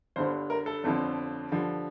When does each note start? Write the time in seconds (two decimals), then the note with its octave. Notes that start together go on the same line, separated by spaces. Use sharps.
0.16 G1 G2 D3 C5
0.50 A#4
0.66 A4
0.84 G1 F2 D3 F3
1.52 G2 D3 F3